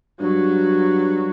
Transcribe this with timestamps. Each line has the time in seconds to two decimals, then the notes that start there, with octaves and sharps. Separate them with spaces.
0.20 G2 F#3